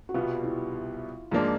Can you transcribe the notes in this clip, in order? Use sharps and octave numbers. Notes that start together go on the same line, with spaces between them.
F#4
C2 B2 G3 B3 F4
E4
G#2 F3 A#3 D4 F4